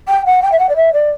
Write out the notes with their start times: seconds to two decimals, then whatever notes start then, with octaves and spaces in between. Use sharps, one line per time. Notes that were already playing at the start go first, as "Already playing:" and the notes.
0.08 G5
0.26 F#5
0.43 G5
0.52 E5
0.59 F#5
0.69 D5
0.76 E5
0.93 D5